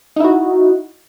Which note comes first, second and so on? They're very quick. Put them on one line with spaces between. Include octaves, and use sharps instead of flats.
D#4 E4 F#4